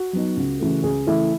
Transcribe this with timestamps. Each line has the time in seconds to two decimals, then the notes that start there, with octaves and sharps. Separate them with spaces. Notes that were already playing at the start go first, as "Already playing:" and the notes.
Already playing: F#4
0.13 F#3 B3 D#4
0.37 C#2
0.60 C#3 E3 A3
0.83 C#2 G#4
1.07 C#3 E3 A3 E4